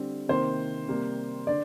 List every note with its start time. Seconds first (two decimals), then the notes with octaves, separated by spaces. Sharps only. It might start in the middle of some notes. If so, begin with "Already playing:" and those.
Already playing: D3 G3 C4
0.28 C3 D#3 A#3 C5
0.88 C3 G3 A#3
1.47 D3 D5